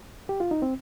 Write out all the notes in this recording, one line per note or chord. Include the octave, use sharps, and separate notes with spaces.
G4
F4
D#4
C4